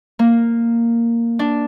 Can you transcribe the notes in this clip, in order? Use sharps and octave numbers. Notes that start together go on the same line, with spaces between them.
A#3
D4